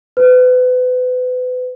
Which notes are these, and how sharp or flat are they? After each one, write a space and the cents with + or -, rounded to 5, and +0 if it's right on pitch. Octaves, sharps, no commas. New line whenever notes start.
B4 +35